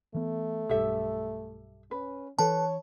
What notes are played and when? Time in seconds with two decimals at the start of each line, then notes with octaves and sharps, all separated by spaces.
0.14 E3 A3 B3
0.69 B1 G2 G4 A4 E5
1.91 C#4 B4
2.39 E3 D4 A4 B4 C#5 A5